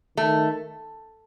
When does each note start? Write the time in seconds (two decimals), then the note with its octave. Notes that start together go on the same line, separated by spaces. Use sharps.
0.17 D#3 A3